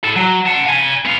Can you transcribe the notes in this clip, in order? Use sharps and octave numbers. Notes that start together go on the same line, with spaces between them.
E4 A4
F#3
F#5 A5
F5 G#5
B3 F5